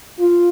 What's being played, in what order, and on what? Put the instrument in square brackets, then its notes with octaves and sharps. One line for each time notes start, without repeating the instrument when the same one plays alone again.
[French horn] F4